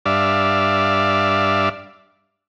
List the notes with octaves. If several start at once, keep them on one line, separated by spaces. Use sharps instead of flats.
G2 D4 D5 E5 F5